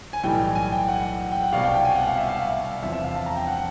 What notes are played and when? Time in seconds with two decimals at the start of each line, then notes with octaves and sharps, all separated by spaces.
0.13 G#5
0.23 B1 A2 E3 G3 G5
0.55 G#5
0.72 G5
0.88 F#5
1.32 G5
1.42 F#5
1.52 C2 B2 G3 F5
1.64 G5
1.75 G5
1.85 G#5
1.95 F#5
2.07 F5
2.18 E5
2.29 F5
2.50 E5
2.83 E2 C3 F3 E5
2.93 E5
3.04 F5
3.14 A5
3.26 A#5
3.36 G5
3.47 F#5